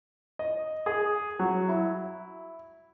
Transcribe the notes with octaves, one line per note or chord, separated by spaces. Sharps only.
D#5
G#4
F#3
E4